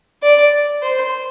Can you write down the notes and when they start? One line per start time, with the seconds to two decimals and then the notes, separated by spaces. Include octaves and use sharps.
0.23 D5
0.82 C5